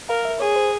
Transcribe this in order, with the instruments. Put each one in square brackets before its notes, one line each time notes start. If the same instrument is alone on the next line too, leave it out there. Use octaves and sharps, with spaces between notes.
[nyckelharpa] A#4 [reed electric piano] F5
[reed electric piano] E5
[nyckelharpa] G#4 [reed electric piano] C#5
[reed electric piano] C5